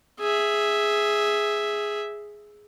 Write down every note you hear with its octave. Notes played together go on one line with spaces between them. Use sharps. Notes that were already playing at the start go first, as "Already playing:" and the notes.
G#4 E5